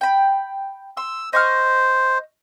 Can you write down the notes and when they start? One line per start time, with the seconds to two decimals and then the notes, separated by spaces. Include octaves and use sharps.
0.01 G5 B5
0.97 C6 E6
1.33 C5 D#5 C#6 F6